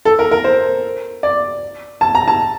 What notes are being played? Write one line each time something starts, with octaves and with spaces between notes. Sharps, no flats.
A4
A#4
A#4
C5
D5
A5
A#5
A5